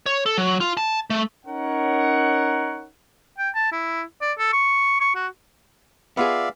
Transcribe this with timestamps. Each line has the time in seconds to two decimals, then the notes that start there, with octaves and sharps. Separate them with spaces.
0.06 C#5
0.26 A4
0.38 F#3
0.61 F4
0.77 A5
1.10 A3
1.46 C#4 D#4 A#4 C#5 F#5
3.39 G5
3.55 A5
3.72 E4
4.21 D5
4.39 A4
4.53 C#6
5.00 C#6
5.15 F#4
6.17 B3 F4 G#4 D5 E5 F5